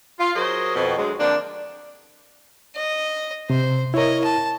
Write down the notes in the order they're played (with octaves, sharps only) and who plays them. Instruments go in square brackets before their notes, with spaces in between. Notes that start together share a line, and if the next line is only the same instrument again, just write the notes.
[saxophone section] F4
F#3 F#4 G#4 A#4 C5 D#5
F2 B2
D2 F#3 G#3
D3 F3 A#3 C4 D4
[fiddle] D#5
[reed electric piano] C3 [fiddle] C5
[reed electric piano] E4 A#4 [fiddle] C#5 D#5
[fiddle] A5